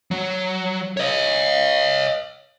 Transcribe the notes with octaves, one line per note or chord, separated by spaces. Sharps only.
F#3
C#5 D#5